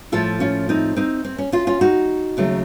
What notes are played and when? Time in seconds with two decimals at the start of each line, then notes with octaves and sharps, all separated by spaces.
0.12 A2 F3 A3 F4 A4
0.40 C#4 F4
0.69 C4 D#4
0.96 C4 D#4
1.25 C4
1.38 C#4
1.52 C#4 F4
1.67 C#4 F4
1.81 D#4 F#4
2.37 D#2 C#3 F#3 A3